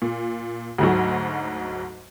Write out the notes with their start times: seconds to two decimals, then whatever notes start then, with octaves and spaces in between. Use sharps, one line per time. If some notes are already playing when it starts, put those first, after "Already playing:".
0.02 A#2
0.78 D2 G#2 F#3